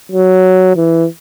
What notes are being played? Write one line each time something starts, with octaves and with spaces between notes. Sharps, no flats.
F#3
E3